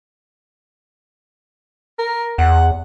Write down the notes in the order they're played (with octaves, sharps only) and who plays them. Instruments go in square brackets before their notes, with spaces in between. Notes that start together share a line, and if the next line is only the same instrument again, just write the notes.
[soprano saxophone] A#4
[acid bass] E2 [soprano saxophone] F#5